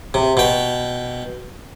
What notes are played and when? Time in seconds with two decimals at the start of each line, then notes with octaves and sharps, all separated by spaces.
0.14 C3
0.37 B2 G5